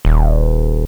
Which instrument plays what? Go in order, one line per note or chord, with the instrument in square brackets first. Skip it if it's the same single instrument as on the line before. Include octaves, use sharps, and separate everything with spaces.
[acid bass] D#1